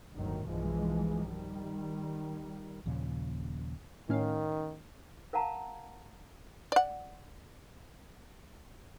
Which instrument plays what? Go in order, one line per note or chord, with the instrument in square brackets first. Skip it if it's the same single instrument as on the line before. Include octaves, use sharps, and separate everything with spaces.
[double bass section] G1 D2 A2 D#3 F#3
B1 G2 E3 F3 G#3
D#3 G3
[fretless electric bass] D#2 A#2 C#3 F3
[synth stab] A2 C#4 F5 [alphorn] D#3
[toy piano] A#4 F5 F#5 A5 A#5
[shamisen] D5 F#5